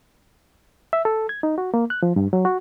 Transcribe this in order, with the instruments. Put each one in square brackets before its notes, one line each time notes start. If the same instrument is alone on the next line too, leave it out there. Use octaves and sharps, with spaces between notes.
[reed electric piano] E5
A4
G#6
D#4
F#4
A#3
F#6
F3
G2
F#3
F#4